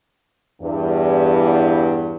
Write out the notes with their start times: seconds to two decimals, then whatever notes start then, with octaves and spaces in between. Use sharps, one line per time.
0.62 E2 G2